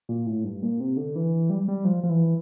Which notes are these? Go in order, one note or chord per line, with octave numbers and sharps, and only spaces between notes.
A#2
A2
G2
A#2
C3
D3
E3
G3
G3
F3
F3
E3